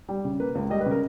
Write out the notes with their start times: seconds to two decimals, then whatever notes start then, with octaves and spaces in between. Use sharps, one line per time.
0.09 G3
0.24 C#3
0.40 A#3 B4
0.55 C#2
0.70 G3 D#5
0.81 B4
0.86 C#3
0.91 A#4